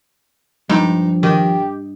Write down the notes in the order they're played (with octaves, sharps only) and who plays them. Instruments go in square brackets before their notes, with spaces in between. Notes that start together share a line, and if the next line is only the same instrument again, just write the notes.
[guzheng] G2 [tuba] F3 [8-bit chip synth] G#3 D#4
[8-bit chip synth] D#3 [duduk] G4 [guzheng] D#5